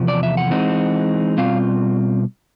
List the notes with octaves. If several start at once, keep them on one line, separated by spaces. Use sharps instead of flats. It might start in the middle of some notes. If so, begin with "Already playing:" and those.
Already playing: E2 C3 F3
D5
E5
F#5
E3 G#3 C4 D#4
B2 G3 C4 F4 F5